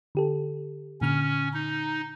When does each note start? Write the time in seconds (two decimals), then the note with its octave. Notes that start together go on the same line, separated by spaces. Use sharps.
0.15 D3 G4 A4
1.01 A#2 D3 C#4 F6
1.54 D#4